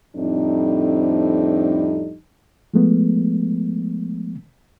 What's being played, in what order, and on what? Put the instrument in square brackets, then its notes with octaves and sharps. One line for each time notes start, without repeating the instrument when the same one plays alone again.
[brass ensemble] F2 A2 G3 C4 D4 D#4
[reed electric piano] F3 G#3 A3 B3